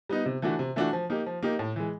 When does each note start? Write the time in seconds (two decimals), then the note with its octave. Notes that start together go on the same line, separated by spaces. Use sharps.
0.09 G3 B3 D#4
0.26 C3
0.42 E3 A3 D4 F#4
0.59 C3
0.76 E3 A3 D4 F#4
0.93 F3
1.10 A#3 D#4 G4
1.26 F3
1.43 A#3 D#4 G4
1.59 A2
1.76 E3 G#3